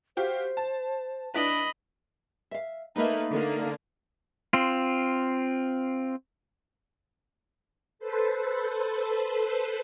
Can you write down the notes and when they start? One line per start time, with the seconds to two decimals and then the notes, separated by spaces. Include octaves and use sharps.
0.17 F#4 G4 C5 F5
0.57 A5
1.34 D4 E4 B4 D#5 B5
2.51 E5 F5
2.96 A3 A#3 D#4 B4 E5
3.30 D3 A#3
4.53 C4 F4
7.99 A4 B4 C5